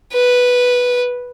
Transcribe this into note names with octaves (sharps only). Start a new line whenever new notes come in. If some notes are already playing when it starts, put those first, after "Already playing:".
B4